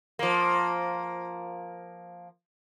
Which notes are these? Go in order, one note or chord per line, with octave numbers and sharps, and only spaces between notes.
F3 A#3